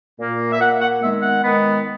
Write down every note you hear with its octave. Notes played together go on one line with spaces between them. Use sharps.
A#2 A#3
E5
A#2 A#3 F#5
F#5
D#3 G#3 B3 E5
F#5
D#3 G#3 B3